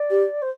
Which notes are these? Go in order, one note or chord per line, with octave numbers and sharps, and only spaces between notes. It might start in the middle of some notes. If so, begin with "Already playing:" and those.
Already playing: D5
G4
C5